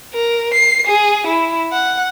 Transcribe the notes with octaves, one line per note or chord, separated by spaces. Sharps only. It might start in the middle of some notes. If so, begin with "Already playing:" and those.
A#4
C7
G#4
E4
F#5